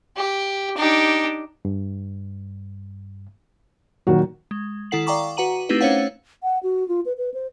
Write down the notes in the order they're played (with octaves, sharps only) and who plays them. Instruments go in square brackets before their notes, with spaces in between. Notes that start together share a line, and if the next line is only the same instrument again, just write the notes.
[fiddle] G4
[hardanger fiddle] D4 G4 [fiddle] D#4
[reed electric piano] G2
[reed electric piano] A#2 F#3 [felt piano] D#3 F#4
[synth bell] G#3
D#3 E4 A4 F#5 C7 F#7
D5 F5 G5 A#5 C#6 D6
F#4 B4 F#5 A#5 D#7 F#7
A3 C4 D#4 E4 G4 B4
A3 C#4 C5 C#5 F5 F#5
[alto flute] F#5
F#4
F4
B4
B4
C5